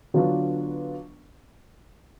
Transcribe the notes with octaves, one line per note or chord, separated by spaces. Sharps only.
D3 F#3 B3 D4 F4